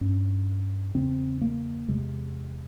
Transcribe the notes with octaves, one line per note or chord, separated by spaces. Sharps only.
G2 C#4
E2 C#3 C4
A#3
E2 C3 G#3